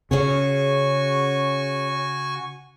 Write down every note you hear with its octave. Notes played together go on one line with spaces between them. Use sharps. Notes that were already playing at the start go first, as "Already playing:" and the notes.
C#3 C#4 F#4 G#4 C#5 G#5 C#6